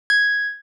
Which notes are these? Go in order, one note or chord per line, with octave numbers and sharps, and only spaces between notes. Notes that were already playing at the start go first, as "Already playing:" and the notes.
G#6